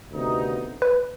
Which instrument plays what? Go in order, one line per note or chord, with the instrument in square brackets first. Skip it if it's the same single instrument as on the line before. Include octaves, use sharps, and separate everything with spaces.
[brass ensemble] D2 C3 D#3 B3 D#4
[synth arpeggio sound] B4